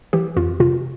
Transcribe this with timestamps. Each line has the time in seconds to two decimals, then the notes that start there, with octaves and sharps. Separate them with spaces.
0.13 E3 G4
0.37 F2 F4
0.60 C3 F4